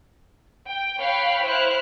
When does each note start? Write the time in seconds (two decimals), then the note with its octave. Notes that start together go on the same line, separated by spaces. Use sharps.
0.69 G5
0.99 C#5 F5 G5 B5 F#6
1.44 E4 C5 F6 F#6